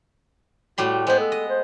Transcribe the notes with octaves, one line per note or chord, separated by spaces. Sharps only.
A2 G3 F#4 C6
G#3 B3 C5
A4
D#5
C5